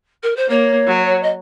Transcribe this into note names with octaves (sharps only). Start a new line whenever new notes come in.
A#4
C5
A#3 C#5
F#3
D#5